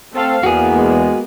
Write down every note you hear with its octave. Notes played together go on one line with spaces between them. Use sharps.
A3 C4 A4 F5
E2 A#3 B3 F#4 G#4
G#3